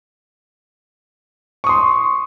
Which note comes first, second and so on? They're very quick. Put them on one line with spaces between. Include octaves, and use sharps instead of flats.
C#6 D#6 C6